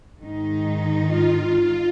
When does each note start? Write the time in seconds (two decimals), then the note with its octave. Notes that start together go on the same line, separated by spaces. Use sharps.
0.23 G#2 D#3 D#4
1.07 F4